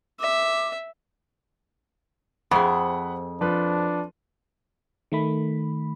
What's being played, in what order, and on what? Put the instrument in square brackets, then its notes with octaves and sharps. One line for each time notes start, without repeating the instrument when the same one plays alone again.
[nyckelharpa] E5 [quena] D6
[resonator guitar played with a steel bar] F2 [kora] C4 F4 G#4 [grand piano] F#5 B5
[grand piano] F3 B4 [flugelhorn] D4
[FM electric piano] D#3 A3 B5